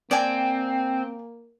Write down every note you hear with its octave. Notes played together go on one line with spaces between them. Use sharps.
A#3 C4 D5 G5 G#5